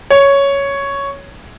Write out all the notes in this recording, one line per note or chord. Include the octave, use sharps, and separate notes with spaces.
C#5